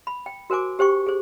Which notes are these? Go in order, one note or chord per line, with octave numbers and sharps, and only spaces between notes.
B5
G5
F#4 A#4 C5 G#5 D6
G4 C5 G5 C#6
G#4 C5